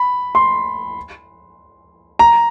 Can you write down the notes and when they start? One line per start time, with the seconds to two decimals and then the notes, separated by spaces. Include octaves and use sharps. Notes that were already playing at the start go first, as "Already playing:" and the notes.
Already playing: B5
0.35 C6
2.19 A#5